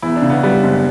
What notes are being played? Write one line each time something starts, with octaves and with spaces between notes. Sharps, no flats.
E2 E4
D4
C#3
B3
G3 B3
F#1